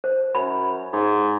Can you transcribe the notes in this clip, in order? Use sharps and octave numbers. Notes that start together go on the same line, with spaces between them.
C5
F#2 B5
G#2